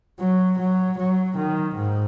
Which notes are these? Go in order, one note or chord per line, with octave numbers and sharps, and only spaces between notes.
F#3
F#3
F#3
D#3
G#2